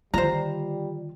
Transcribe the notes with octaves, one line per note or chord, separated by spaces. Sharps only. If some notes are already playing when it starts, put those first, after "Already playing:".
D3 D#3 G3 F4 C5 A#5